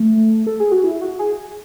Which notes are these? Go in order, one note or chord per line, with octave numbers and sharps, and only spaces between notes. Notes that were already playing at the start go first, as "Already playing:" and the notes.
Already playing: A3
A4
G#4
F#4
E4
F#4
G#4